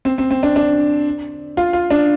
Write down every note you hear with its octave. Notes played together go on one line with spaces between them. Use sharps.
C4
C4
C4
D4
D4
F4
F4
D4